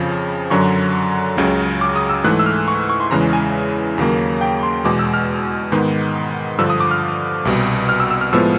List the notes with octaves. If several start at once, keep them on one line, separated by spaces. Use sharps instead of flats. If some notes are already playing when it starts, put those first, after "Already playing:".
Already playing: F2 C#3 F3
F#2 D3 F#3 C#6
C#2 C#3 F#3
D6
D#6
E6
G#2 E3 A3 F#6
E6
F6
C#6
C#6
C6
E2 C#3 E3 G#3 A#5
G#5
D#2 C#3 F#3 A#3
G5
C6
E2 B2 G#3 D6
E6
F6
G#2 D#3 G#3 B3
G2 D3 F3 E6
D#6
D6
F6
C2 B2 G3
F6
E6
E6
F6
A2 F3 G#3 B3 E6